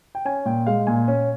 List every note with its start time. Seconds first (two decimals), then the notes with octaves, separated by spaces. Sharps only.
0.15 G5
0.25 C#4 G#5
0.45 A#2 G5
0.67 G#3 F5
0.87 A#2 G#5
1.08 C#4